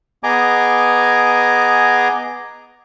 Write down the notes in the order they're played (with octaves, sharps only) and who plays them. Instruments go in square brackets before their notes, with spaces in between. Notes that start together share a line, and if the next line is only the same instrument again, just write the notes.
[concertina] B3 G#4 D#5 G#5 A#5 D6